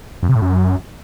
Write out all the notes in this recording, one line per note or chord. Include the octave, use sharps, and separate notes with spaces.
F2
C3
A2
F#2